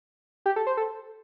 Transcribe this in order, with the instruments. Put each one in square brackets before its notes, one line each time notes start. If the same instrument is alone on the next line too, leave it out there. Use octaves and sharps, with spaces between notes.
[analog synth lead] G4
A4
C5
A4